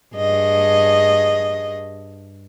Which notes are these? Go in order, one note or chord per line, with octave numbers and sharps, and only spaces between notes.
G2 G#4 D#5